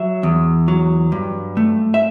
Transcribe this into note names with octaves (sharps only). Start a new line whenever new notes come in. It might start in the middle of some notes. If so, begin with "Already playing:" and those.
Already playing: F#3 E5
E2
F#3
G2
A3
E5